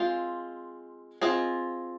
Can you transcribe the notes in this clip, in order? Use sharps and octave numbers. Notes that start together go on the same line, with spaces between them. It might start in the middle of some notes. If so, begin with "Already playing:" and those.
Already playing: G#3 C4 F4
C4 F4 G#4 D#5